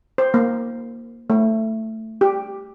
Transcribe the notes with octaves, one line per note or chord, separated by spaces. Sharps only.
C5
A#3
A3
G4